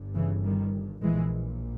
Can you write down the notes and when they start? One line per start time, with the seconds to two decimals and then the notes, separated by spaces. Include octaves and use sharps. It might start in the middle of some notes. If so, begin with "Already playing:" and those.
Already playing: G1 G2
0.15 C#3 E3
0.43 D#3 G3
1.02 A#1 A#2 E3 G#3